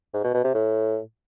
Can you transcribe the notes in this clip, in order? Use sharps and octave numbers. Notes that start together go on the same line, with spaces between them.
G#2
B2
B2
C3
A2